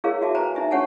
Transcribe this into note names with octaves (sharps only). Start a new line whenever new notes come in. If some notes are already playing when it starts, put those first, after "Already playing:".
E4 G#4 A#4 C#5 F5
F#4 E5 A5
B4 C5 G#5 A#5
D#4 E5 G#5
D4 G4 C#5 F#5 G#5 A5